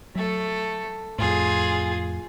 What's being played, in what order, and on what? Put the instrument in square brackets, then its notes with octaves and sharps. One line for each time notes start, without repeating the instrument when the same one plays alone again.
[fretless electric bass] F#3 [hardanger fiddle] A3 A4
[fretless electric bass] F2 A2 [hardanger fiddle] F4 G#4